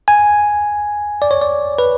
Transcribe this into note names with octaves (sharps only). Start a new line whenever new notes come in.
G#5
D5
C#5
D5
B4